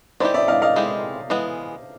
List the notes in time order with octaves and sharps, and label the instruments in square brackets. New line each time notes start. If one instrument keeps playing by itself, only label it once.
[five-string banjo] D#3 G#3 C4 E4 G4 [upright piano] C5 D5
[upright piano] D5 E5
D#5 F5
D#5 F5
[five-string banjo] D#3 G#3 C4 E4 G4
E3 G#3 B3